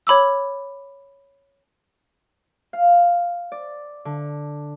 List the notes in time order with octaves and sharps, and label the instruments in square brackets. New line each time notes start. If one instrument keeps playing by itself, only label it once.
[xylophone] C#5 B5 D6 E6
[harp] F5
D5
D3